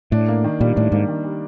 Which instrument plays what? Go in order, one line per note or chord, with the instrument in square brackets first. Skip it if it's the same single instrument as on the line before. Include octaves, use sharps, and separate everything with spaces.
[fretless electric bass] A2 [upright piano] D4
[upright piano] A#3
D#3
[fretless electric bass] A#2 [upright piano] G3
[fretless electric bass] A2 [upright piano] D4
[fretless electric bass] G#2 [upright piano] A#3
[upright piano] D#3
G3